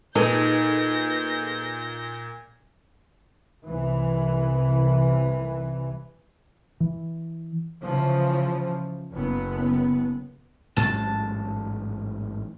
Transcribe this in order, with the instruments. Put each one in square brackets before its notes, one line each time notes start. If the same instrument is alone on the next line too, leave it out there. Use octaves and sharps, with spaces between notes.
[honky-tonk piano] A#2 [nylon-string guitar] D#4 [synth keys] G#4 A4 B4 [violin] G6 A#6
[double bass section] C2 E3
[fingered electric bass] E3
[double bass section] C#3 E3 F3
F#1 B3
[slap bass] A1 G#2 F#3 [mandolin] A5